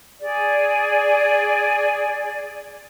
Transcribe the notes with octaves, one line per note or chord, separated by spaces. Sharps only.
G#4 D5